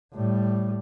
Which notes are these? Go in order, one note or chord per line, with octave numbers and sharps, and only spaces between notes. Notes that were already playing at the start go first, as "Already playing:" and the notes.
A2 G3